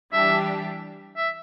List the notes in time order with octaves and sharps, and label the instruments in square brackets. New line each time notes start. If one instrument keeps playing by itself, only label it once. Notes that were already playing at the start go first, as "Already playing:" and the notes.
[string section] E3 G3 D4 G4 [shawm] E5
[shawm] E5